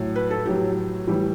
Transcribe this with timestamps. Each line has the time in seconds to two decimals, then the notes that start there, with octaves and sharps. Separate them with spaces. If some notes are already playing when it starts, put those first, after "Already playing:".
Already playing: A2 F#3
0.16 B4
0.31 A4
0.46 A2 F#3 G4
1.07 A2 E3 G3